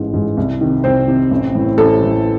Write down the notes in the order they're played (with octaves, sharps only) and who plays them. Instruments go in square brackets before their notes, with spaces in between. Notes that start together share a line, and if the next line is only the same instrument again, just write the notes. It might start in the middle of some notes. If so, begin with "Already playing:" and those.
Already playing: [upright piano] A1 G#2 E3
G#2 E3
C2
C3 D#3
C2 C4 C5
C3 D#3
A1
A2 E3
A1 A4
A2 E3